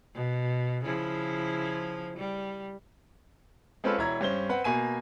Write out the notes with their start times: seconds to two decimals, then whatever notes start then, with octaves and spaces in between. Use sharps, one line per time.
0.15 B2
0.84 C#3 F3 E4
2.17 G3
3.84 G#3 C4 C#4 F4 A4 B4
3.98 E1 E4 C#5 A#5 G#6
4.21 G2 C#4 C5 G7
4.49 C4 B4 F#5
4.64 B2 A#3 G#5 D#7